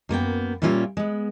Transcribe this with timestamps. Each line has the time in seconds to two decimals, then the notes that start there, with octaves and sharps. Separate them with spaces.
0.09 F#2 A#3 B3 G5
0.62 A#2 G3 A#3 C#4 F4 E5
0.97 G#3 B3